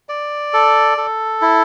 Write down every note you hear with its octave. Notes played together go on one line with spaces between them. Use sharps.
D5
A4
A4
E4